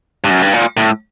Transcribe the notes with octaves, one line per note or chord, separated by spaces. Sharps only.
G2
F#2
G2
A#2
A2